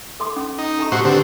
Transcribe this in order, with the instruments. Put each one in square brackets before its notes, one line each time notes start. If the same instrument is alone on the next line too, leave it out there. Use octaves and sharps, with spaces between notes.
[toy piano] A4 C6 D6
C#4
[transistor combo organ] D#4
[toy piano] A4 A#5 C#6
[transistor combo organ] A2 F#4 C5 [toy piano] G4
[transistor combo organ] D3 C4 [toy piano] G4 B4